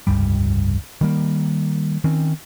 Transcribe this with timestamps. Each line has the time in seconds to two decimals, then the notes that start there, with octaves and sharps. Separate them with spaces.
0.07 F1 C#2 G2 G3
1.01 D#3 G3 A#3
2.04 D#3 C4 C#4